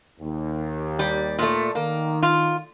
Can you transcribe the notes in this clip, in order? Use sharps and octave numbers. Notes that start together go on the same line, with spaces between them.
D#2
G3
A#2 A3
D#3 A#3
F4